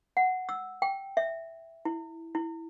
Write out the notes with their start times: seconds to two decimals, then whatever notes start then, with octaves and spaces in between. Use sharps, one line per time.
0.17 F#5
0.49 E6
0.82 G5
1.17 E5
1.85 E4
2.35 E4